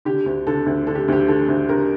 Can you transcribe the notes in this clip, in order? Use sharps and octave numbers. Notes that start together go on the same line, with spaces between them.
D3 G4
D2
D3 A4
D2
D3 A4
G4
D2 G4
D3 A4
D2
D3 G4 A#4